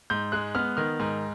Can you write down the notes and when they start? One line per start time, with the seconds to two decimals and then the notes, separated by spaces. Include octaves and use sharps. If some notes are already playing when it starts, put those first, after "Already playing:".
0.10 G#2 G6
0.32 G#3 F#6
0.55 B3 F6
0.77 D#3 F6
0.99 G#2